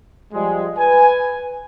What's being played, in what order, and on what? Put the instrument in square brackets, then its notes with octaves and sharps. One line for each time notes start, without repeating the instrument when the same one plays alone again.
[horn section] F3 G3 G#3
B4 G#5